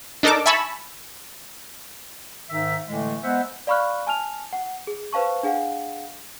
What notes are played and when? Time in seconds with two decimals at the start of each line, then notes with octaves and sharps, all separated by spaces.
0.23 D4 D#4 A4 A#4 A5 D6
0.46 E5 G#5 A5 B5 C#6 E6
2.50 G#2 D#3 D#4 E5
2.88 A2 D3 E3 G#3 A3
3.24 G#3 B3 C5 E5 F#5
3.67 D5 F5 B5 C#6 F6 F#6
4.07 G#5 A5 F6 F7
4.53 F#5
4.87 G#4
5.13 B4 C5 F5 A5 C#6
5.43 D4 G#4 F5 F#5